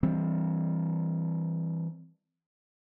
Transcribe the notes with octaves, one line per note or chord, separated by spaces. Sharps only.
E3 G3 C4